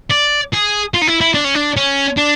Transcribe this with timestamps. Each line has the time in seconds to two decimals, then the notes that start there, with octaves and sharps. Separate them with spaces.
0.11 D5
0.53 G#4
0.94 F4
1.01 D#4
1.07 E4
1.21 E4
1.34 D4
1.44 C#4
1.55 D4
1.77 C#4
2.17 D4